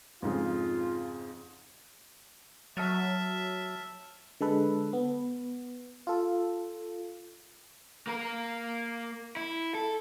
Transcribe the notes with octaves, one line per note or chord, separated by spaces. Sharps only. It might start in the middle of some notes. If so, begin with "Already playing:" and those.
F2 G#2 C#3 F4
F#3 E5 A5 F6 A6
D3 G#3 A4 B4
B3
F4 A4
A#3 A#4
E4
A4